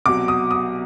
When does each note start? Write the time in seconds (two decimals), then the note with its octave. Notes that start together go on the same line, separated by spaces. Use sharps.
0.06 C2 B2 F#3 D6
0.28 D#6
0.51 D#6